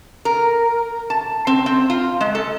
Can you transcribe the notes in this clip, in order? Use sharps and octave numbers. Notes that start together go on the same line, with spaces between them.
A#4
A5
C4
C4
F4
G#3
A4